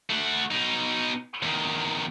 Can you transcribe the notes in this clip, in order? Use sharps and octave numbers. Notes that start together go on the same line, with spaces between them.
A3 F#4
B2 D#4
E2 D#3